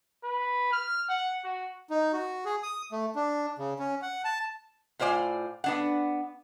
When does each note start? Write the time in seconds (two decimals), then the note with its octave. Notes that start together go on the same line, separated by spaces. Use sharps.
0.24 B4
0.72 F6
1.09 F#5
1.44 F#4
1.90 D#4
2.13 F#4
2.45 G#4
2.63 D#6
2.92 A3
3.15 D4
3.59 C#3
3.79 C#4
4.02 F#5
4.24 A5
4.99 A2 F4 C5 D5 G#5
5.64 B3 D4 F#5